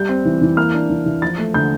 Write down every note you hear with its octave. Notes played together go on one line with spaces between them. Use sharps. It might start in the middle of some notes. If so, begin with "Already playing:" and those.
Already playing: G3 G6
C4
E3
E3
A#3 F6
D4
E3
E3
F3 A6
A3
D3 G6